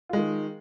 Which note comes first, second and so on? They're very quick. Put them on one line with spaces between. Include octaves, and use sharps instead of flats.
F4 G#3 D#3